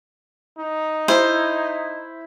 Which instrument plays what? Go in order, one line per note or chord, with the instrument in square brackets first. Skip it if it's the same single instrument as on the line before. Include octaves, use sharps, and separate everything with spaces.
[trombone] D#4
[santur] E4 [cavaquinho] C5